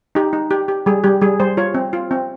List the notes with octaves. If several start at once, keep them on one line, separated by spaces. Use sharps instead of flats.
D#4 G4
D#4
G4
G4
G3 G#4
G3 G4
G3 G#4
G3 C5
F4 C#5
C4
F4
C4